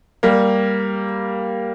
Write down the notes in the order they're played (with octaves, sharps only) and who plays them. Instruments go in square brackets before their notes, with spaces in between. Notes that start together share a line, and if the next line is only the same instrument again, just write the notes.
[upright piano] G3 A#3